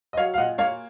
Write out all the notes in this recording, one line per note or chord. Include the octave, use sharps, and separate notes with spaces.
D#5
F#3 C#5 F5
F5
A#2 D#5 F#5
A#3 C#5 F5